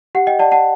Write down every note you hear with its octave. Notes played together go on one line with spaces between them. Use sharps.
G4 F#5
D#5 G5
D5 F#5 A5
F#5 A5